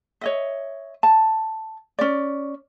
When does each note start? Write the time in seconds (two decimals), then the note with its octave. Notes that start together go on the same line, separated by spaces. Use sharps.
0.21 C#5 D#5 E5
1.03 A5
1.99 C#4 D5